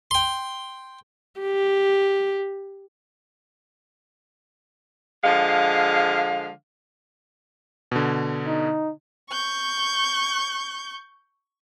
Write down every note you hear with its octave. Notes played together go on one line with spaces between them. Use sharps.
G5 C6
G4
D3 F3 G#3 F5
B2 D3
D#4
C#6 G6